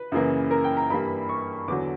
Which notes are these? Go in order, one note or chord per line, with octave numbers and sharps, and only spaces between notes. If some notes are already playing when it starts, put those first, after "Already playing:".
Already playing: B4
F#2 C#3 E3 A#3
A#4
G5
A#5
G2 E3 G3 A#3 B5
C#6
E2 D3 F#3 D6